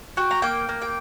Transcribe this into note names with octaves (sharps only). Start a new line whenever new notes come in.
F#4 G5
A#5
A#3 G5
A#3
G5